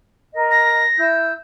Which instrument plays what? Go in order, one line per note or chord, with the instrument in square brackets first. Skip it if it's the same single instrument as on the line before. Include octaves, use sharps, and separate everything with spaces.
[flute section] A#4 D#5
[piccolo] A#6
[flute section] E4 E6 G6